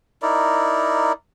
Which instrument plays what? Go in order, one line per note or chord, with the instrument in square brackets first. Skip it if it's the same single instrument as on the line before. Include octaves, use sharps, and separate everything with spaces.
[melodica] D#4 E4 A#4 D5